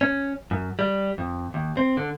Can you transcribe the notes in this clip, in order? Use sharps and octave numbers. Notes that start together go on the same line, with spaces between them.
C#4
F#2
G3
F2
D#2
C4
D3